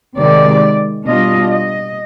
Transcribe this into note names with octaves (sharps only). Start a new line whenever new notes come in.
C3 D#3 G#3 D5
B2 G3 D4 F4 D#5
D#5